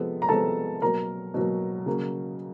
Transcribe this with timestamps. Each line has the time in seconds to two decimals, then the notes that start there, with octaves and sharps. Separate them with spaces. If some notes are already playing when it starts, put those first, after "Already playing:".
Already playing: C3 F3 G#3 B3 A4
0.22 A#5
0.29 C3 F3 G#3 B3 A4 A5
0.82 B2 F#3 A#3 A#4 A#5
1.34 B2 F#3 A#3
1.86 C#3 F#3 A#3